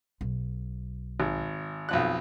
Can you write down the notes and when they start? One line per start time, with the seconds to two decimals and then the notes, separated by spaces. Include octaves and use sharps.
0.21 B1
1.20 G#1
1.89 B1 F2 F#6